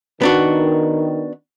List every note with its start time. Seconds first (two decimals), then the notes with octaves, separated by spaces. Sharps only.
0.22 D#3 B3 D4 F#4